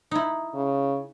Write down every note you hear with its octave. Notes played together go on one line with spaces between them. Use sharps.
D#4 E4
C#3